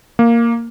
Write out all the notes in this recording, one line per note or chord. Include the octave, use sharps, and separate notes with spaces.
A#3